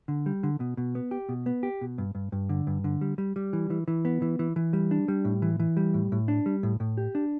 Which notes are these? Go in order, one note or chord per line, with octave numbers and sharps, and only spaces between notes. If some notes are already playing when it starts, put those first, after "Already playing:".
D3
G3
D3
B2
B2
B3
G4
B2
B3
G4
B2
G2
G2
G2
D3
G2
D3
G3
G3
G3
E3
E3
E3
B3
E3
E3
E3
G3
D4
G3
A2
E3
E3
G3
A2
A2
D4
G3
A2
A2
G4
D4